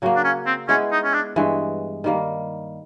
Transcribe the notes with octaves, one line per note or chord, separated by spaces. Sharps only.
C#3 F#3 A#3
D4
C#4
C4
G#3 B3 C#4 E4 G#4
D#4
C#4
D4
G2 E3 G#3
D#3 G3 A#3